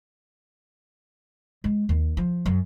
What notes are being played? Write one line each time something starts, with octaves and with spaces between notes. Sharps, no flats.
G#3
D#2
F3
F#2